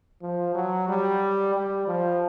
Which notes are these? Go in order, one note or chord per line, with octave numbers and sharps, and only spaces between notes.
F3
F#3
G3
G3
F3